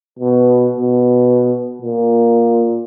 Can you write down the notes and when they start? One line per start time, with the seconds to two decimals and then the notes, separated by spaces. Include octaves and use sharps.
0.19 B2
0.77 B2
1.82 A#2